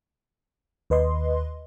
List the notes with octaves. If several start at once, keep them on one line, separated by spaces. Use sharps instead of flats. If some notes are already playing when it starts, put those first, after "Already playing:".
D#2 B4 D#5 C6